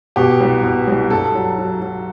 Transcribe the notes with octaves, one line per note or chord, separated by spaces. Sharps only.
B2 G4
C2
B2
C2
G2 A4
F#3
F#3
F#3